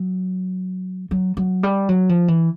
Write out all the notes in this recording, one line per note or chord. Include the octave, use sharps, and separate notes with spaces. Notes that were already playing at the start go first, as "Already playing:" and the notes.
Already playing: F#3
F#3
F#3
G3
F#3
F3
E3